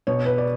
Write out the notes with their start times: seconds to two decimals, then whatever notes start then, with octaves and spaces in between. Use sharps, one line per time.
0.07 B2 C#5
0.26 B4
0.38 D5